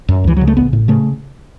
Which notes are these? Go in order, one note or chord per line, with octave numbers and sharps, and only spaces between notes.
F#2
C#2 E3
C#3 F#3
A3
A1 B3
A2
C#3 A3